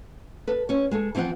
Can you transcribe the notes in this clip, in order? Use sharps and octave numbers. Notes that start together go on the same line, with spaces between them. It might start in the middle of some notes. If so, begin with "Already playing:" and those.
A4 B4
C#4 C#5
G#3 G#4 A4
E3 F3 C4 F5 F#5